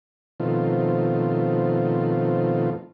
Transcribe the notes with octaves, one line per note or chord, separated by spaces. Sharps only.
B2 D#3 F3 A3 C4 F4